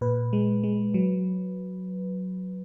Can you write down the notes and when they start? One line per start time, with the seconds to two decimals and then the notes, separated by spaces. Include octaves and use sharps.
0.01 A#2 B4
0.33 G#3
0.64 G#3
0.94 F#3